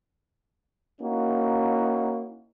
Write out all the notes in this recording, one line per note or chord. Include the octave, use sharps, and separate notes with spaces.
A#3 C#4 D#4 E4 F#4